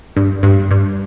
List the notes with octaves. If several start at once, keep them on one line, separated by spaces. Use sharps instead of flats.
G2
G2
G2